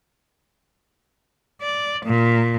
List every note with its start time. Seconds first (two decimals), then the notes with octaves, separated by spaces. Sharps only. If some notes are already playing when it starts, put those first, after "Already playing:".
1.62 D5
2.05 A#2